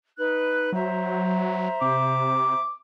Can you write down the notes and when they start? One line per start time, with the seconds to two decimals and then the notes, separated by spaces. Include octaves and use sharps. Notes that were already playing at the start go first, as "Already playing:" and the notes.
0.16 D#4 B4 F#6
0.72 F#3 C5 E5 A#5
1.81 C3 D6